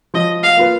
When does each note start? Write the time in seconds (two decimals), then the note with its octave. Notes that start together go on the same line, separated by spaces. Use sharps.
0.14 F3 D#5
0.43 F5
0.57 A#3 F4 B4